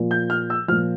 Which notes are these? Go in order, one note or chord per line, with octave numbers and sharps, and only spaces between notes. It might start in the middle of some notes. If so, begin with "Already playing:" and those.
Already playing: A#2 F3
G6
F6
E6
A#2 F3 F6